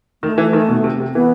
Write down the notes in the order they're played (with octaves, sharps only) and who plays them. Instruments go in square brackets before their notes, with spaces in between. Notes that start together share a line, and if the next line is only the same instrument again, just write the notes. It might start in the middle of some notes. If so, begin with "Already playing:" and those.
[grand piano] D#3 [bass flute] A3
[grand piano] E3
D#3
B2
C3
C3
[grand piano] E3 [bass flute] B3